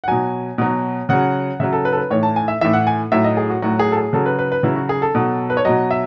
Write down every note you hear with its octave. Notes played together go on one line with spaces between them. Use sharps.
F#5
B2 F#3 G#5
B2 F#3
C#3 F#3 F#5
C#3 F#3 E5
A4
B4
A4
B4
A2 E3 C#5
A5
G#5
E5
A2 E3 E5
F#5
G#5
A2 F#3 E5
D#5
G#4
F#4
A2 F#3 F#4
G#4
A4
G#4
C#3 F#3 A4
B4
B4
B4
C#3 F#3 E4
F#4
G#4
A4
B2 F#3
B4
C#5
B2 F#3 D#5
E5